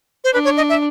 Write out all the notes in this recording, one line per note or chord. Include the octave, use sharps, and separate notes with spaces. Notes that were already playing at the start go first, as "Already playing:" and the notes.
C5
D4 B4
C#5
D#5
E5